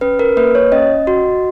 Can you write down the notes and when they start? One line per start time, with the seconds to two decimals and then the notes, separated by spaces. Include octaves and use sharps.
0.01 C#4 B4
0.19 A#4
0.37 A#3 B4
0.55 C#5
0.72 C#4 D#5
1.07 F#4